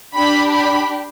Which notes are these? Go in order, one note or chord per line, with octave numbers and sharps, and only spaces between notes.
D4 G4 B5
B5